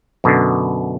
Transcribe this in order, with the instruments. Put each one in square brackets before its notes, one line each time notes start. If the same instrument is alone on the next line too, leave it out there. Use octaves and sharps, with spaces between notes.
[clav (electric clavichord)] F#2 B2 D3